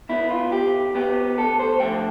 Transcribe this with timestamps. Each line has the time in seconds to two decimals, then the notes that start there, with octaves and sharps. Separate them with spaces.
0.09 B2 B3 E4
0.30 F4
0.51 B1 G4
0.95 B2 B3 G4
1.37 D2 A4
1.59 C5
1.80 D3 F3 A3 G5